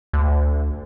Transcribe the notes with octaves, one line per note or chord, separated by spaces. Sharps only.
D2